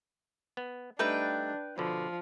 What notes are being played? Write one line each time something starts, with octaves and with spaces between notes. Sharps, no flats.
B3
G3 A3 D4 D#4 B4 G5
B2 D3 F3